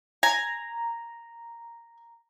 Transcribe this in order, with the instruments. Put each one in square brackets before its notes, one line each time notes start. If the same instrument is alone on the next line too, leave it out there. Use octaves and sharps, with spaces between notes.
[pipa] G#5 [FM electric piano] A#5